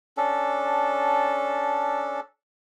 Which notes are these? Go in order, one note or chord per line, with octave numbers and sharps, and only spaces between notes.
C#4 D4 A4